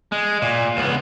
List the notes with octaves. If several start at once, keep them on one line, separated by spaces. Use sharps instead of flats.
G#3
A#2
C#2 B3